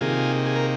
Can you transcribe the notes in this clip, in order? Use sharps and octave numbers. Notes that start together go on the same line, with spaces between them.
C3 D#3 A#3 F4 G#4
G#4
A#4